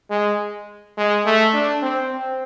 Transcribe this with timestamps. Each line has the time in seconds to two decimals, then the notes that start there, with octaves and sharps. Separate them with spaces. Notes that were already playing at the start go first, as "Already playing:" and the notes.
0.10 G#3
0.97 G#3
1.25 A3
1.53 D4
1.82 C4
2.12 C4